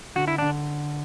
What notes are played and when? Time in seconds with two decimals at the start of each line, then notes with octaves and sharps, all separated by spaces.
0.15 D3 F#4
0.28 E4
0.38 D3 D4